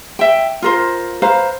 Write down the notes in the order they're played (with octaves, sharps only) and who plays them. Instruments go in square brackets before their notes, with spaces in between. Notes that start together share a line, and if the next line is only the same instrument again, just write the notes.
[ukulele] E5 G5
F4 A#4 C5
B4 C5 F5 A#5